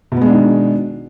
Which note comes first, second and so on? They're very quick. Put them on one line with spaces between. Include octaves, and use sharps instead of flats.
B2 B3 G#3 D4 D#3